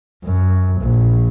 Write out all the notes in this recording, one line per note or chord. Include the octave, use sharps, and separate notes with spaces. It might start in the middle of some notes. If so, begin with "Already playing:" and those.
F#2
A#1